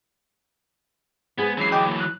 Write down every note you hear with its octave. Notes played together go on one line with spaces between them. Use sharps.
G#3 B3 G#4 C5 G#6
E3 F#3 C#4 C7
D#5 G5 D6
A#3
F#6